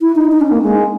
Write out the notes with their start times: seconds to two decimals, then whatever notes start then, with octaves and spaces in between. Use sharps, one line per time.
0.01 E4
0.16 D#4
0.32 D#4
0.41 C#4
0.51 A#3
0.62 G#3